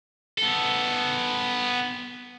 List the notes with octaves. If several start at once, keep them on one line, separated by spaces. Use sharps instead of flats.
B3 A4